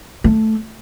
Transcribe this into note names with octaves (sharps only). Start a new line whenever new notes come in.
A3